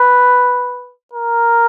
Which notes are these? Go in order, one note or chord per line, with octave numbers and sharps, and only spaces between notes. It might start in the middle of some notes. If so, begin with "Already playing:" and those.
Already playing: B4
A#4